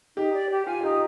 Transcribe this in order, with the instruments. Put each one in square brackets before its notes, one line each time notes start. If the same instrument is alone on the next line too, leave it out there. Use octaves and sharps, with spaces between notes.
[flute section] D#4 [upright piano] G4
[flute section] D5
G4
[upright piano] F4 [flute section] G#5
[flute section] D#4 [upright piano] G4